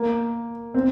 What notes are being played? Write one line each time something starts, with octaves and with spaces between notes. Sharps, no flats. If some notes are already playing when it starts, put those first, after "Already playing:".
Already playing: A#3
C4